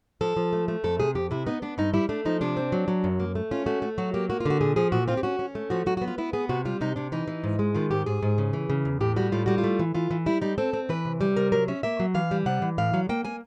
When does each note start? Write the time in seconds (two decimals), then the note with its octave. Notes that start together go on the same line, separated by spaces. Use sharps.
0.21 F3 A4
0.37 F3
0.53 A3
0.68 A3
0.84 F2 A4
1.00 C3 G#4
1.15 F2 G4
1.31 C3 E4
1.47 B3 D#4
1.62 B3 D4
1.78 G2 D#4
1.94 G3 E4
2.09 A3 D4
2.25 F3 D#4
2.41 C3 D4
2.57 C4
2.72 F#3
2.88 F#3
3.04 F#2
3.20 A#3
3.35 A3
3.51 C#4 F4
3.66 A3 F#4
3.82 A3
3.98 F#3 F#4
4.14 A#3 G4
4.30 A#3 F#4
4.40 F4
4.46 D3 F#4
4.61 A#2 G#4
4.76 F3 G#4
4.92 A#2 F#4
5.08 C4 F4
5.17 G4
5.23 C#4 F#4
5.39 C#4
5.55 A3
5.70 F3 F#4
5.86 F#3 F#4
5.97 F#4
6.02 B3
6.08 F4
6.18 B3 E4
6.33 B3 G#4
6.49 C3 F#4
6.65 G3 F4
6.81 C3 D#4
6.96 C3 D4
7.12 E3 D#4
7.28 E3
7.44 G#2
7.59 G#3
7.74 D#3 F4
7.91 G#2 G4
8.06 G#2 G#4
8.22 G#2
8.38 C#3
8.53 E3
8.70 C#3
8.85 E2
9.01 A2 G4
9.16 G3 F#4
9.32 A2 F4
9.46 G3 F#4
9.58 F4
9.64 A3
9.79 E3
9.95 E3 F4
10.11 E3
10.26 G3 E4
10.41 G3 D#4
10.58 C4 A4
10.73 C4
10.89 E3 B4
11.05 C3
11.21 G3
11.36 C3 A#4
11.52 F#3 A#4
11.68 C#4 E5
11.83 A#3 E5
12.00 F#3
12.14 E3 F5
12.31 G3
12.46 C3 F#5
12.62 E3
12.78 A2 F5
12.94 F#3
13.09 A#3 G5
13.25 A#3 G#5